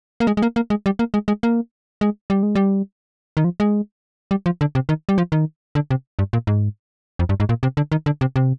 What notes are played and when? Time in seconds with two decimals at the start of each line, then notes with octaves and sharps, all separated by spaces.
0.20 A#3
0.27 G#3
0.37 G#3
0.42 A#3
0.56 A#3
0.70 G#3
0.86 G3
0.99 A#3
1.14 G#3
1.28 G#3
1.43 A#3
2.01 G#3
2.30 G3
2.43 G#3
2.55 G3
3.37 D#3
3.44 F3
3.60 G#3
4.31 G3
4.46 F3
4.61 D3
4.75 C3
4.89 D#3
5.09 G3
5.18 F3
5.32 D#3
5.75 D3
5.91 C3
6.19 G2
6.33 A#2
6.47 G#2
7.19 F2
7.29 G2
7.40 G#2
7.49 A#2
7.63 C3
7.77 D3
7.92 D#3
8.06 D3
8.21 C3
8.36 C3